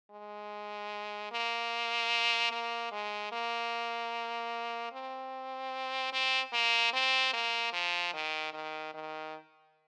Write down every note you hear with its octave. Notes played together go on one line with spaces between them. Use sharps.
G#3
A#3
A#3
G#3
A#3
C4
C4
A#3
C4
A#3
F3
D#3
D#3
D#3